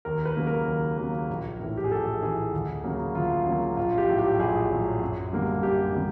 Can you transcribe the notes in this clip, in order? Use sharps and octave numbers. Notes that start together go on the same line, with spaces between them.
D#2 A#4
B4
C#3 F#3 A#3
A#4
D#2
C#3 F#3 A#3
A#1
A2 E3
G4
G#4
A#1 A4
A2 E3 G#4
D2
C#3 F#3 A#3
D2 F4
C#3 F#3 A#3
A#1 F4
G4
A2 F#3
G4
A#1 G#4
A2 F#3
F#2
D3 G3 A#3
F#2 G4
D3 G3 A#3